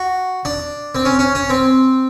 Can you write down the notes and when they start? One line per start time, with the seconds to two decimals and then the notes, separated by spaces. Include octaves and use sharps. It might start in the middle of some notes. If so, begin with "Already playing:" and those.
Already playing: F#4
0.45 D4
0.95 C4
1.05 C#4
1.19 C#4
1.35 C#4
1.50 C4